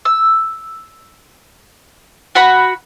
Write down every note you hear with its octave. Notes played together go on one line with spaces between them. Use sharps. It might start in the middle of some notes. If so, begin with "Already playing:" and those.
E6
F#4 F#5 B5